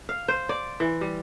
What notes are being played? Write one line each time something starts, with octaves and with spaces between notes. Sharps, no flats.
F5
C5
D5
E3
G3